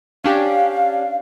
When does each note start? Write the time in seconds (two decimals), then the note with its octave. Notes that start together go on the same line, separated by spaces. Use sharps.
0.24 C#4 D4 G4 F5